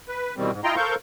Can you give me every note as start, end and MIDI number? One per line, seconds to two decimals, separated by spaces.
0.08 0.34 71
0.37 0.51 47
0.37 0.51 51
0.37 0.51 52
0.37 0.51 55
0.37 0.51 60
0.51 0.61 44
0.64 0.76 64
0.64 0.76 65
0.64 0.76 75
0.64 0.76 79
0.64 0.76 82
0.64 0.76 84
0.76 0.95 69
0.76 0.95 70
0.76 0.95 72
0.76 0.95 77
0.76 0.95 85
0.76 0.95 91